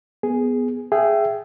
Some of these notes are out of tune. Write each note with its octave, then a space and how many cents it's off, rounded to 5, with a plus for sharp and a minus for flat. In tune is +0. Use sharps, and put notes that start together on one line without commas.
B3 +0 G#4 +0
G#4 +0 E5 +15 G5 -20